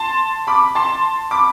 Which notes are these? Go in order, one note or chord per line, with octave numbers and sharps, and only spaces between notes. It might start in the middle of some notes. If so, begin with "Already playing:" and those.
Already playing: A5 C6
B5 D6
A5 C6
B5 D6